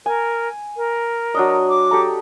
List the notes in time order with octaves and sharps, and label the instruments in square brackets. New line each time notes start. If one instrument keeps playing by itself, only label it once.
[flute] A#4 [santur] G#5
[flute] A#4
[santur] F#3 D4 D#5
[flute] D6
[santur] G4 A4 A#5